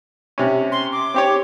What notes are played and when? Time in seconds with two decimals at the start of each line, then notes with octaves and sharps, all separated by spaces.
0.38 C3 C#4
0.72 C6
0.92 D6
1.14 C4 G4 C#5